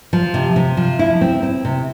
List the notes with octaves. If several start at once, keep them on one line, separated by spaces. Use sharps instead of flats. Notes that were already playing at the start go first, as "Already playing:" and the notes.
F3
C3
C3
F3
E4
C4
C4
C3